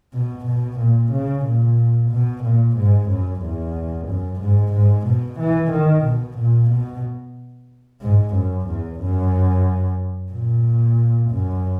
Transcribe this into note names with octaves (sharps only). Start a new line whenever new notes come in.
B2
B2
A#2
C#3
A#2
B2
A#2
G#2
F#2
E2
F#2
G#2
G#2
B2
E3
D#3
B2
A#2
B2
G#2
F#2
E2
F#2
A#2
F#2